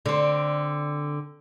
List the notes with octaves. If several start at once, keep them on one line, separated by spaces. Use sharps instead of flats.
D3 C4